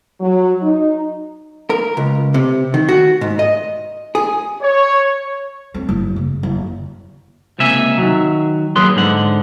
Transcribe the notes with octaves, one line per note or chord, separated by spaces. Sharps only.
F#3
D#4
A#4
C#2
C3
D#3
F#4
G#2
D#5
G#4
C#5
F2
F#1
C#3
F#1
C#2 C3 A#3 E5 G#5
D#3 F#3
F#3 A#3 G#4 B4 C6
G#2 D3 F#5